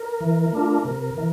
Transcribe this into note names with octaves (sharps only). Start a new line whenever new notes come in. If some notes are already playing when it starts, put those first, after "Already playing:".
Already playing: A#4
E3
A3 D4 F4
C3
E3